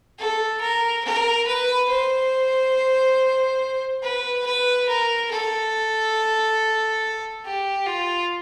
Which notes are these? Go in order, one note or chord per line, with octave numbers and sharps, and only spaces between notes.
A4
A#4
A#4
B4
C5
B4
B4
A#4
A4
G4
F4